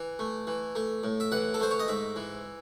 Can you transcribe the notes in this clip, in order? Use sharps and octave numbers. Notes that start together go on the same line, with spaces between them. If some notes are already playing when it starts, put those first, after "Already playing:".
Already playing: E3
A3
E3
A3
A2
E5
E3 F#5
A4
A3 C5
C#5
D#5
G#2 E5
E3